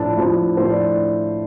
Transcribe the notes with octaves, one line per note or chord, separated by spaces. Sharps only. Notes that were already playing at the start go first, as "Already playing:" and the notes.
Already playing: A2 F3 D4 A5
A2 F3 D4
A2 F3 D4 C5
D5